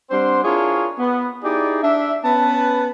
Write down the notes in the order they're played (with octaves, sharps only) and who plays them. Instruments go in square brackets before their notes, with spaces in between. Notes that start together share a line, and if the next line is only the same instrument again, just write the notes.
[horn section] G3 C4 D4 C5 F#5 C6
D4 E4 F4 G#4 A#4 C#5
B3
D#4 E4 G4 G#4 D5
D4 E5
B3 C#4 B4 A5